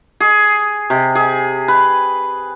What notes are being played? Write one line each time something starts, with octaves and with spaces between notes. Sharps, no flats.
G#4
C3
G#4
B4